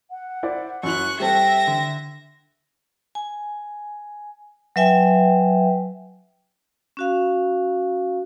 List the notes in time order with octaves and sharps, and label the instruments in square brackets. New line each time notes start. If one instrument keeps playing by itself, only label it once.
[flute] F#5
[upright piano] E4 C5 D5
[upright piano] F#2 E4 [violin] C#6 F#6
[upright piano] G3 C4 A4 [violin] E5 A#6 [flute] G5
[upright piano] D3
[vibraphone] G#5
F#3 B4 E5 G5 G#5
C#4 F#4 F5